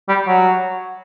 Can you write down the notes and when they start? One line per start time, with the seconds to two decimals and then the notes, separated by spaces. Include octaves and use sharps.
0.09 G3
0.27 F#3